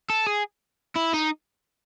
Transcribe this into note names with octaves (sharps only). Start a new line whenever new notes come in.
A4
G#4
E4
D#4